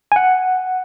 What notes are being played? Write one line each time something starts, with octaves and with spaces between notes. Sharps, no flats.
G#5
F#5